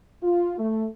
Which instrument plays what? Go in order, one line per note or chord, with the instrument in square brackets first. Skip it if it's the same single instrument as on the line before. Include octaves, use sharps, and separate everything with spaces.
[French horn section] F4
A3